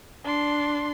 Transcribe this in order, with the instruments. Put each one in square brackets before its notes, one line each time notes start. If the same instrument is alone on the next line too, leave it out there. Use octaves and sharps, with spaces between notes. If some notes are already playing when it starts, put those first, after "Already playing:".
[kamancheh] D4 C6